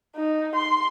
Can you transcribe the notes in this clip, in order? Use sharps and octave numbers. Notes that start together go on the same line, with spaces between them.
D#4
C6